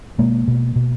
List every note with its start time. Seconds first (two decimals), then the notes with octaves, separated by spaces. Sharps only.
0.18 B2 G#3 A#3
0.48 B2
0.76 B2